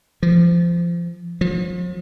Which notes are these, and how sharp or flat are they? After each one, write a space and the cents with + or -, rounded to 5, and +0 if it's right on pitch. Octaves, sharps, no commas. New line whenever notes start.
F3 -25
F3 +40